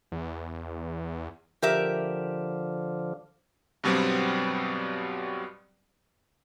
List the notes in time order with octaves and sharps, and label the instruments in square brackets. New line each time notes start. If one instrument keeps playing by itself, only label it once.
[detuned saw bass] E2
[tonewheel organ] D3 F3 [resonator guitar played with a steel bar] G4 A#4 E5
[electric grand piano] G2 B2 F#3 G3 B3 C4